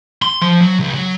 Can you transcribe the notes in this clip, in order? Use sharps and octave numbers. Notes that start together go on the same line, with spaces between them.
C6
F3
F#3
C#2
F#3